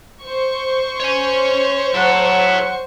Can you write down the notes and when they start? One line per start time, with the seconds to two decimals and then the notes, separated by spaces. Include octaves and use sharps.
0.23 C5 C#6
1.00 C#5 G#5
1.94 F#3 E4 A4 F#5